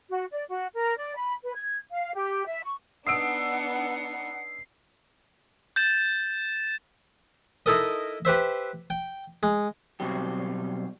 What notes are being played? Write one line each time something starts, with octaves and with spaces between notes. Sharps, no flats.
F#4
D5
F#4
A#4
D5
B5
B4
G#6
F5
G4
E5
C#6
B3 D4 D#4 F#5 D#6 E6 C7 D7
G6 A6 E7
D#4 E4 A4 A#4 D#5
G4 B4 C5 E5
G5
G#3
B2 F#3 G3 C4 G4